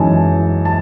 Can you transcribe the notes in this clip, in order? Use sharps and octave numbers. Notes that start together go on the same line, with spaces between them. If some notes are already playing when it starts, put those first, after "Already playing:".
Already playing: F#2 E3 G#3 D#4 G#5 A5
A5